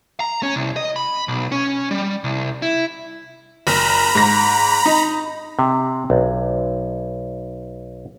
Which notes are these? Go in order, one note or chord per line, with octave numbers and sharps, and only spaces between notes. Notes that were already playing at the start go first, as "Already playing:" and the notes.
A#5
C#4
C2
D#5
B5
B1
C#4
G3
C2
E4
F#1 A#5 B5
G#2 A#6
D#4
C3
B1